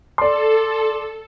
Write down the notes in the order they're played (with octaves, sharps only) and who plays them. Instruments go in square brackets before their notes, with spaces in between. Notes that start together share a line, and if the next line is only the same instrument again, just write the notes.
[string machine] A4 [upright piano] D5 C6